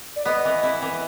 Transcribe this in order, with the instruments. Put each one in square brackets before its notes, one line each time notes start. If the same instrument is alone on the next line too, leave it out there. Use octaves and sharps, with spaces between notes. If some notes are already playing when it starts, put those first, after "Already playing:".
[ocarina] D5
[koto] B3 [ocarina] D#5
[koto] E3
E4
E3